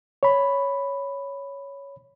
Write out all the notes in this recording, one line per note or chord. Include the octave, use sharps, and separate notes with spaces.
C#5 B5